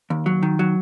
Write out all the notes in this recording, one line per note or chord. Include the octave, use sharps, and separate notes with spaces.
D#2
F#3
D#3
F#3